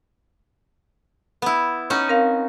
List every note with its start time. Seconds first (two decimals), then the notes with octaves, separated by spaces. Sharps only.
1.42 B3 E4
1.90 C#4 D#4 F#4
2.08 C4 A#4 F5